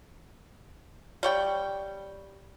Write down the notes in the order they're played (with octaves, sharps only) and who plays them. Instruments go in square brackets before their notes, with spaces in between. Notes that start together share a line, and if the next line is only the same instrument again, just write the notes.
[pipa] G3 C#5 G5